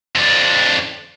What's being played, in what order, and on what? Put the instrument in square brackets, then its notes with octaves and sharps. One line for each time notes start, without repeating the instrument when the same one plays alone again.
[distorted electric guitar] F2 D4